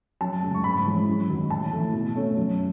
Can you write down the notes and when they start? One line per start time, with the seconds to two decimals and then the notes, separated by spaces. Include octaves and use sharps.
0.21 F#2 A5
0.43 C#3 G#3
0.54 C#6
0.64 G#2 B5
0.86 E3 G#3 C#4
1.08 F#2
1.29 D#3 F#3
1.50 A2 A5
1.72 E3 A3
1.93 B2
2.16 A3 C#4
2.37 F#2